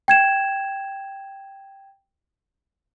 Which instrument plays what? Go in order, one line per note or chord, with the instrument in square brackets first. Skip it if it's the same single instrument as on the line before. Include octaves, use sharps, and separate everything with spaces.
[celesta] G5 G#6 E7